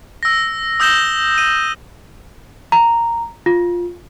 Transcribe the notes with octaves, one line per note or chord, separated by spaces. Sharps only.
E6 A#6
D#6 E6 G6 A#6 E7 G7
D#7
A#5
F4